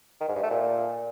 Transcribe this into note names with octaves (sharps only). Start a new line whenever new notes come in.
D#3
G#2
G2
A3
A#2